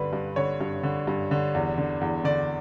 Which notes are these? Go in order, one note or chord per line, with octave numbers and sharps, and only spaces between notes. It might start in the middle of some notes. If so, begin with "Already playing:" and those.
Already playing: G2 D3 B4
G2
D3 C#5
G2
D3
G2
D3
E2
D3
E2
D3 D5